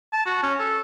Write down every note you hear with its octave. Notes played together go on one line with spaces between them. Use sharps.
A5
F#4
C#4
A4